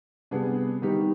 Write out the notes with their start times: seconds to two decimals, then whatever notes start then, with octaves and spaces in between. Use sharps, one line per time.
0.31 C3 G3 B3 D4 G#4
0.82 D#3 G3 B3 D#4 G4